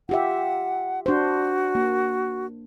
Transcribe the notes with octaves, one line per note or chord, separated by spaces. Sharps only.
F4 G4 E5 F#5
D4 F#4 C5
A#3